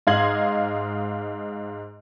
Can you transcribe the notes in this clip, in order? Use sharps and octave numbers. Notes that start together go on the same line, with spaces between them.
G#2 D#5 F5 C6 G#6 F#7